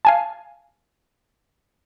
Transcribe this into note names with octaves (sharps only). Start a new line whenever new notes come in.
F5 G#5 A5